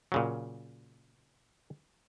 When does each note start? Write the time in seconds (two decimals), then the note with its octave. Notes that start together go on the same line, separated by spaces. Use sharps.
0.12 A#2 C#3 F#3